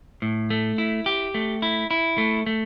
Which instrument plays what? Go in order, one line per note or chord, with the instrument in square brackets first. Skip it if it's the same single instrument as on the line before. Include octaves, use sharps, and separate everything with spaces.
[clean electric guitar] A2
A3
E4
G4
A3
E4
E4
A3
A3